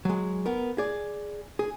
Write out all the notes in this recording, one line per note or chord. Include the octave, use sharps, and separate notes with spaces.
F#3 G#3
B3 A#4
G#4 D5
G#4